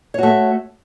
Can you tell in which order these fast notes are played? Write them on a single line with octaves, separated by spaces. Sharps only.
C#5 F#4 A3